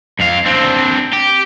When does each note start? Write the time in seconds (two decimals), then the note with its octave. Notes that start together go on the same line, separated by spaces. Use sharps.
0.20 F2 F5
0.46 C4 D4
1.13 G4